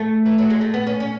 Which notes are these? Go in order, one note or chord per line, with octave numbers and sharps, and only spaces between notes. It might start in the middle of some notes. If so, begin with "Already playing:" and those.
Already playing: A3
E3
F#3
G#3
A3
B3
C#4
C#4